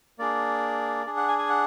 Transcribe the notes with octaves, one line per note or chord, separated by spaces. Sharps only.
A#3 D4 G#4 D5
D4 G#4
F#5
G#5
G#5
F#5